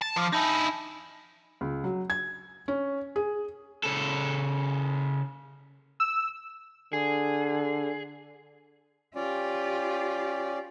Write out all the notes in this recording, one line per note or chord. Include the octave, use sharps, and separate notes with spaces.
A5
F3 C5 F5 D6 F6
D#4 E4 G#5 A5
C#2
F#3
G#6
C#4
G#4
C#3 A4
E6
D3 G#4
C#4 F4 G4 D5